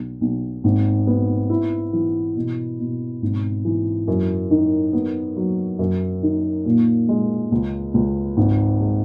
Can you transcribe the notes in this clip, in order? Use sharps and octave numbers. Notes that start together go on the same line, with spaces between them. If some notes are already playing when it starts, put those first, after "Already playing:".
Already playing: B1
B1
G#1
B3
E4
E3
B2
B2
G#1
E3
F#2
D#3
B3
F#3
F#2
D#3
A#2
G#3
C#2
C#2
G#1
G#3